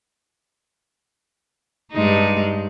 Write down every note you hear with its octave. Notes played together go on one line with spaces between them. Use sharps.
G2 G#3 D#4